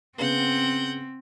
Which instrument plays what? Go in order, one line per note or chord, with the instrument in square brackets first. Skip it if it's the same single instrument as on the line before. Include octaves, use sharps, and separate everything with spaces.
[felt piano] C#3 B3 [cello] C4 [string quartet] F#5 G6